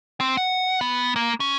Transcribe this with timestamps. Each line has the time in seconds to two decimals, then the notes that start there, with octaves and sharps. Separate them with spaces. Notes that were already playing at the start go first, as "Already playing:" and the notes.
0.20 C4
0.37 F#5
0.81 B3
1.16 A#3
1.40 C#4